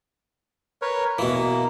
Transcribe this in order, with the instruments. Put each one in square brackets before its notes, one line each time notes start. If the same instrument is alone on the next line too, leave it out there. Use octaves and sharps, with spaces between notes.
[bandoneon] A#4 B4 C#5
[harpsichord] B2 E3 [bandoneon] A#3